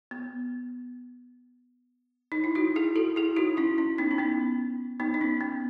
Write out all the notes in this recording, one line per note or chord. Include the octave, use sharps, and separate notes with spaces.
B3
D#4
E4
D#4 F#4
E4 G#4
F#4 A4
E4 G#4
D#4 F#4
C#4 E4
C#4
B3 D#4
C#4
B3 D#4
B3 D#4
D#4
C#4
B3